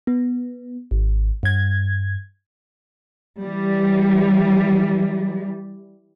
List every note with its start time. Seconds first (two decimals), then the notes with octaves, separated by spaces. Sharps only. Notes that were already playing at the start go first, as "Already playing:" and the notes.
0.07 B3
0.91 G#1
1.43 G2 G#6
3.40 E3 G3